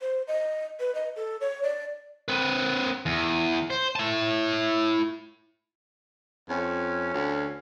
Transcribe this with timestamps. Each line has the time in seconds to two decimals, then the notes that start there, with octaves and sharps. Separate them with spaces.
0.01 C5
0.28 D#5
0.80 B4
0.95 D#5
1.16 A4
1.41 C#5
1.63 D5
2.28 C4 B4
3.06 E2
3.70 C5
3.96 E4 A5
6.49 F2 C#4
7.14 D2